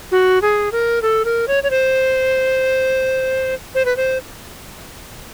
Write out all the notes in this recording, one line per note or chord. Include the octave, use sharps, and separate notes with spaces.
F#4
G#4
A#4
A4
A#4
C#5
C#5
C5
C5
B4
C5